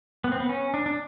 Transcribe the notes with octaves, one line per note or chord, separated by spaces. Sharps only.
B3
C4
B3
C#4
D4
D4